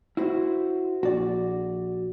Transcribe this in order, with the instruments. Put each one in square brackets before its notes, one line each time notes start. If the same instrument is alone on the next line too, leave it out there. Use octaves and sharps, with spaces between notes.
[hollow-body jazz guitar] E4 F#4 C5
[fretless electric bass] A#1 [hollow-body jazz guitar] F#4 D5